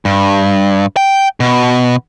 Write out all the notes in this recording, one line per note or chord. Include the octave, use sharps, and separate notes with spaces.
G2
G5
B2